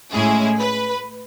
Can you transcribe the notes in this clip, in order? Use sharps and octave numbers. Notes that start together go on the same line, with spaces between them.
A2 G#3 C#4 E4 G#4
B4